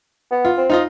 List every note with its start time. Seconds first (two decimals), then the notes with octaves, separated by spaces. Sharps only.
0.31 B3
0.45 F4
0.58 C4
0.70 D#4 F4 D#5